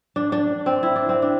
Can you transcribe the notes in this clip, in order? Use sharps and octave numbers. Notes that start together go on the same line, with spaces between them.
D4
D4
C4
E4
D4
C4
D4